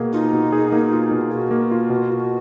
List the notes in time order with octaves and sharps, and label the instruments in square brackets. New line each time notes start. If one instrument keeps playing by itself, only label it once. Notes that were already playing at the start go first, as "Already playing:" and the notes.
Already playing: [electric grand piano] B2 A#3 G#4
[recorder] D#4 [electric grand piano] F4
[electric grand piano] B2
G#4
A#3
F4
B2
[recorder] F#4 [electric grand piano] G#4
[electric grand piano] A#3
F4
B2
F4